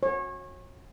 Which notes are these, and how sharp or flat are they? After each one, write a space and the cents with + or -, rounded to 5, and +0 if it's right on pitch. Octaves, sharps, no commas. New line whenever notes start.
C#5 -30